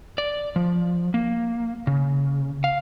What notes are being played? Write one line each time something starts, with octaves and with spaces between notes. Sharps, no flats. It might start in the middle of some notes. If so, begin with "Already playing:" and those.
D5
F3
A#3
C#3
F5